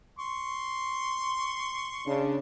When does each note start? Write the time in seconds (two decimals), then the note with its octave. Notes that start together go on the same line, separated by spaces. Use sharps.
0.19 C6 C#6
2.05 C#3 D4